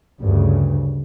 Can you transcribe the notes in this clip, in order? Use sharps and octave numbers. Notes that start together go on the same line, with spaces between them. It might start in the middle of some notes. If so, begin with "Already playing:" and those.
D2 G2 C#3